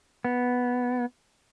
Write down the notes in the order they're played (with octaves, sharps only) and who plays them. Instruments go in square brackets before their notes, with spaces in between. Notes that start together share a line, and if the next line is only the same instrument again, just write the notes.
[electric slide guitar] B3